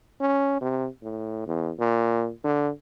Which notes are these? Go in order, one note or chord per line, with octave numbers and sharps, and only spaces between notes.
C#4
C3
A2
E2
A#2
D3